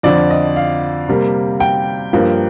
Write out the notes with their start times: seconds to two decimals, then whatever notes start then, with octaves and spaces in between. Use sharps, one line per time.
0.03 F2 D3 F3 D5
0.30 D#5
0.56 F5
1.08 C3 G3 A#3
1.60 G5
2.13 G2 F3 A#3